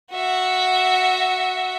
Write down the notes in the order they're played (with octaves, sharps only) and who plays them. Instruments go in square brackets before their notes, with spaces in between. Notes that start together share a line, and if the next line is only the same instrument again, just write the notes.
[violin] F#4 E5